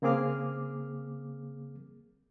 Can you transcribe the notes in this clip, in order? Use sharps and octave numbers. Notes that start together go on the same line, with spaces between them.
C#3 A#3 C4 G#4 D6 F6